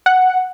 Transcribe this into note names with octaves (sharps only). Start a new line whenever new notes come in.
F#5